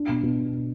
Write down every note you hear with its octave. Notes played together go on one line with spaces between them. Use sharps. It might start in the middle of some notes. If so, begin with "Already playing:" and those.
Already playing: D4
B2
B2